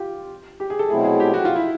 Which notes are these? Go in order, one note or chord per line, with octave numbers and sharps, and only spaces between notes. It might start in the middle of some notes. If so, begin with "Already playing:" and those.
Already playing: F4 G4
G4
G#4
A4
B2 F#3 A3 C4 E4 G#4
G#4
G4
F#4
F4
E4